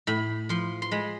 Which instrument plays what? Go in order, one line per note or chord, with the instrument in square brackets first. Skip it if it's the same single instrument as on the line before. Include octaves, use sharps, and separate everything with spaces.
[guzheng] A2 B5
F3 C6
C6
G#3 B5